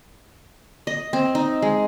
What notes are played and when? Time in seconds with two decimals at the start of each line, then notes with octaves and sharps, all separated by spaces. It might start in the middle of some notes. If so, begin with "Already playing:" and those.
0.87 D#5
1.13 C4
1.35 D#4
1.62 G#3